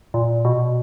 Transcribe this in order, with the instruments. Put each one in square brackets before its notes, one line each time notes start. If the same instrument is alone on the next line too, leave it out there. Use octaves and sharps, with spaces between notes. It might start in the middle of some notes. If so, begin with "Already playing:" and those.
[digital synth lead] A#2
B2